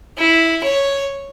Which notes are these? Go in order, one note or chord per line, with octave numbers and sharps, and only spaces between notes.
E4
C#5